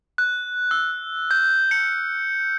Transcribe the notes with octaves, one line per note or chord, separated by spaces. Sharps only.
F#6
E6
G6
C#7